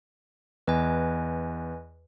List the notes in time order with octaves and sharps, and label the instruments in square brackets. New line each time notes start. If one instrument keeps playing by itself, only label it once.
[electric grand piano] E2 [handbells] B4 D#5 G#5